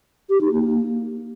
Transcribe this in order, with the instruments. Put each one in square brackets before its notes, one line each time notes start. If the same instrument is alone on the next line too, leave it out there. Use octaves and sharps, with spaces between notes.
[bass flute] G4
D#4
A#3